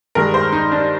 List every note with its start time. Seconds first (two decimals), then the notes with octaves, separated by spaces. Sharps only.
0.15 G2 D#3 G#3 A#4
0.34 C5
0.52 D#4
0.72 D4